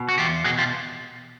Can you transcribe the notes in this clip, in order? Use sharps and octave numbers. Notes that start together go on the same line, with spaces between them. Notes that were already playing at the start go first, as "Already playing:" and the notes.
Already playing: B2
F#4
E2 F4 G4
B2 F#4 G#4
F4 G4